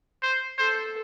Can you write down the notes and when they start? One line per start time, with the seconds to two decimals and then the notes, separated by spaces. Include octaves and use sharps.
0.22 C5
0.58 A4 C5